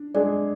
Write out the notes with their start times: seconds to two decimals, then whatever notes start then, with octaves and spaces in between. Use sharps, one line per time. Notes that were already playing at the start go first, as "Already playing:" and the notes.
Already playing: D4
0.14 G#3 D4 G#4 D5